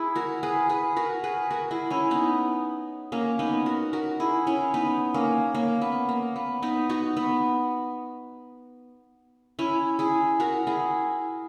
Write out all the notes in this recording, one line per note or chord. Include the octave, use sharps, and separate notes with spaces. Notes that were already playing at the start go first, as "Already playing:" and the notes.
Already playing: E4 G#4
F#4 A#4
G#4 B4
G#4 B4
F#4 A#4
G#4 B4
F#4 A#4
E4 G#4
C#4 E4
B3 D#4
A#3 C#4
B3 D#4
F#4 A#4
F#4 A#4
E4 G#4
C#4 E4
B3 D#4
A#3 C#4
A#3 C#4
B3
A#3
B3
B3 D#4
D#4 F#4
B3
C#4 E4
E4 G#4
F#4 A#4
E4 G#4